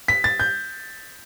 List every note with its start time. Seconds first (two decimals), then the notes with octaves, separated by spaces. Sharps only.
0.08 B6
0.24 A6
0.40 G6